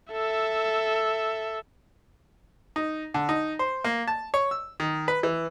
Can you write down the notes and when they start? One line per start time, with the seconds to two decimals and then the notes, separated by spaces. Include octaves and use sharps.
0.12 A4 E5
2.76 D#4
3.14 D3
3.29 D#4
3.59 C5
3.84 A#3
4.08 A5
4.34 C#5
4.51 E6
4.80 D#3
5.08 B4
5.23 E3